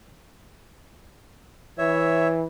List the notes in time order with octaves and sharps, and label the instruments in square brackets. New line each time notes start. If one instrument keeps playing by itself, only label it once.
[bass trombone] E3 [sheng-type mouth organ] C#5 E5